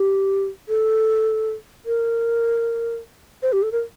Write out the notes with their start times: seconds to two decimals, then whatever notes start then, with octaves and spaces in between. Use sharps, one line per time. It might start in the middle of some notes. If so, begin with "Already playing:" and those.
Already playing: G4
0.69 A4
1.86 A#4
3.42 C5
3.53 G4
3.63 A4
3.72 A#4